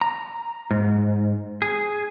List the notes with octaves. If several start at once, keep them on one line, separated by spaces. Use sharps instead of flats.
A#5
G#2
G#4